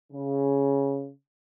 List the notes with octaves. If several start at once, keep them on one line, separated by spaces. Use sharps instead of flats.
C#3